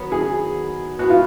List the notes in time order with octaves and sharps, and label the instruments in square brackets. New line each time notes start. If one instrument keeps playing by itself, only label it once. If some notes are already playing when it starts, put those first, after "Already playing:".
Already playing: [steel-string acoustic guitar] D#3 F#3 B3
[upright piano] G#4
[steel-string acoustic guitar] D#3 G#3 B3 [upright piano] F#4
[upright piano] F4